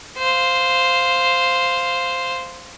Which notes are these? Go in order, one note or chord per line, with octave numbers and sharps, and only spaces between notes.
C5 F5